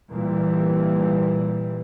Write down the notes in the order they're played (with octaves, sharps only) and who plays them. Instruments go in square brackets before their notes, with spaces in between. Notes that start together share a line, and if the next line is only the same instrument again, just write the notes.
[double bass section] A#2 E3 G3